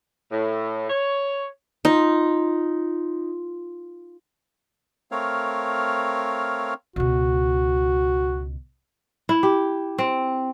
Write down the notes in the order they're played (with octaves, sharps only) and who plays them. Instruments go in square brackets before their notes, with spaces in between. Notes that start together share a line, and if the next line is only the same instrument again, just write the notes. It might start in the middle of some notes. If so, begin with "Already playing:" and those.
[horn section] A2
C#5
[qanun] D#4 [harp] F4
[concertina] A3 C4 A#4 C#5 F5
[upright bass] C#2 B2 [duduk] F#4
[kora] E4
G4
C4